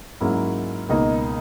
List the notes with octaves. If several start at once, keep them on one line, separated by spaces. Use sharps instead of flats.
G#2 F#3 A#3 C#4 E4
C#2 B2 A#3 D#4